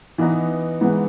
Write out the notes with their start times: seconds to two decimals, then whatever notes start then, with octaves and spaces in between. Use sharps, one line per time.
0.18 E3 B3 D#4
0.81 G#2 E3 B3